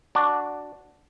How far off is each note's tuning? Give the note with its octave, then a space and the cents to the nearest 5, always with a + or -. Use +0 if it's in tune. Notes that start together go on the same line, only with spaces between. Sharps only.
D4 +0 F#4 +0 D5 +0